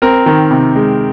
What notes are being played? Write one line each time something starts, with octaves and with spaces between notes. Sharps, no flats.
C4 A#4
D#3
C3
G#3